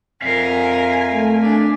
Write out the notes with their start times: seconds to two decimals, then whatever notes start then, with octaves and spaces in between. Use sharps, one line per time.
0.22 F2 A#4 E5 F5 G#5
1.12 A3
1.41 D4